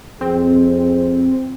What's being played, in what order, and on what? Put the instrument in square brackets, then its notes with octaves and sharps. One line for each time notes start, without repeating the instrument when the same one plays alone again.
[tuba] F2 [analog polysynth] C4 [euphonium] G#4